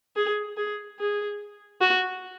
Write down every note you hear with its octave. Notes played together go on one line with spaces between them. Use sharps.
G#4
G#4
G#4
F#4